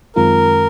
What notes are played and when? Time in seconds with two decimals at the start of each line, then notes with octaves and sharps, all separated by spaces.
0.16 F#2 D#3 G#3 C4 F4 A#4